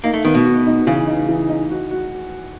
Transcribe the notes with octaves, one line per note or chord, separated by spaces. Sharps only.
A#3 D#4
A3
D#3 B3
B2
F#4
D#4
C#3 E3
D#4
E3
D#4
F#4
F#4